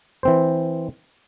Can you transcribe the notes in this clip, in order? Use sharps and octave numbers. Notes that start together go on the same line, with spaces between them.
E3 C4 C5